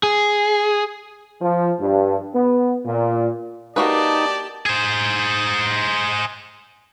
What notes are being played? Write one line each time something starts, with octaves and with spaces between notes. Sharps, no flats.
G#4
F3
G2
B3
A#2
A#3 D#4 F#4 G4 B4 D5 A5
G#4 C5